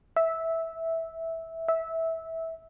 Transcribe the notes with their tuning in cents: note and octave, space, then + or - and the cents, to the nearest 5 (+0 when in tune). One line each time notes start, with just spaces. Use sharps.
E5 -10
E5 -15